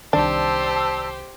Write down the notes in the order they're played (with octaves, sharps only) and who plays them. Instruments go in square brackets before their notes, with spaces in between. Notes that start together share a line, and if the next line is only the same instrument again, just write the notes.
[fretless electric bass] C2 D#3 [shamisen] D4 [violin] G4 C5 [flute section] D5 A5 E6